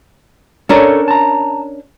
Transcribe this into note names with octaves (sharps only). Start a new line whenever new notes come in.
C#4 D4 A4 A#4 C#5
A5 A#5